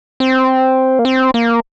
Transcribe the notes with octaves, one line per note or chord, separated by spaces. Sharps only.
C4
A#3
C4
A#3